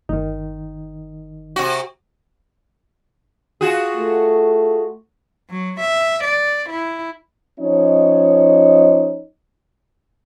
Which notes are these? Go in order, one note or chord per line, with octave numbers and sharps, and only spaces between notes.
G1 D#3 D#4
C3 F#4
F4 F#4 G#4
A3
F#3
E5
D5
E4
F3 C#4 D#4 C#5 D#5